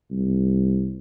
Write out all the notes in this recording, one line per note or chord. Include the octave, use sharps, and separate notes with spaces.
C2